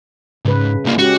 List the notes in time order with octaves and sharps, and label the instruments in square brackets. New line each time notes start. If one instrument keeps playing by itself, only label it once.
[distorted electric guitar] G#2 [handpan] C#3 B4
[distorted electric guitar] C2 A#3
[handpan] G#3 C#4 G4 [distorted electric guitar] F#4